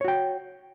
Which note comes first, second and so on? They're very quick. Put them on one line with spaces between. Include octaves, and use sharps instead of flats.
C#5 F#4 G5